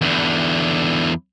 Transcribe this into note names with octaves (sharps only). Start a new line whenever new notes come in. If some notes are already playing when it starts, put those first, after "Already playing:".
E2 D3